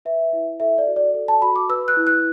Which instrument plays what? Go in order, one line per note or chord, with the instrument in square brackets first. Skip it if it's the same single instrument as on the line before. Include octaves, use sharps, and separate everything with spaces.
[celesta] B4 E5
E4
A4 E5
D5
F#4
D5
A4
A5
F#4 B5
D6
B4 E6
F#6
E4
F#6